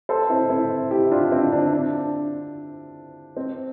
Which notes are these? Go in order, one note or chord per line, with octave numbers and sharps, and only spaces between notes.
A4 C5
C4 E4
C4 E4
E4 G4
D4 F4
C4 E4
D4
D4
C4